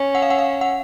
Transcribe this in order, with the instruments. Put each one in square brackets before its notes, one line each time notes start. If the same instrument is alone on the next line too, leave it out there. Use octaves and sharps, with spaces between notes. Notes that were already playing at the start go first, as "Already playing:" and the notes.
Already playing: [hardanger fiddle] C#4
[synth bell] F#5
F5
F#5
F5
F#5